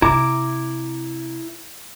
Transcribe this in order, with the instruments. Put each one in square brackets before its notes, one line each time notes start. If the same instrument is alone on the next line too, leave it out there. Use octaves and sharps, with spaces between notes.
[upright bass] C3 [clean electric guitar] E4 A#5 [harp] D6